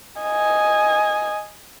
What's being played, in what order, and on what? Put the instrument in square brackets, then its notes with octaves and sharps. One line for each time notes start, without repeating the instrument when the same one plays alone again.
[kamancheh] D#5 G#5